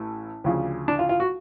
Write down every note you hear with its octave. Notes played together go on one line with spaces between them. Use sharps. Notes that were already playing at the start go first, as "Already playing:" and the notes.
Already playing: A1 A2
D2 C#3 F3
D4
F4
F4
F#4